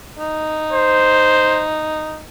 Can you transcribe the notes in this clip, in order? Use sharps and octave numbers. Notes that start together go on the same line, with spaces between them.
D#4
C5